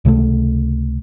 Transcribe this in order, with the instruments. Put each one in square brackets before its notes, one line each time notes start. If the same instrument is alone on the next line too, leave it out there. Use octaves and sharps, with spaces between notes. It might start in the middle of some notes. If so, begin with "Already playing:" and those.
[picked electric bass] C#2 C3 F#3 A3